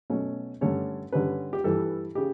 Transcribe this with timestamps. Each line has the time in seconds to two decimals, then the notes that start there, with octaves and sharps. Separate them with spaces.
0.10 B2 F#3 A3 C#4
0.61 G2 D3 A3 C#4 C#5
1.12 G2 D3 G3 C#4 B4
1.53 G4
1.64 G2 E3 G3 A4
2.15 C#3 G4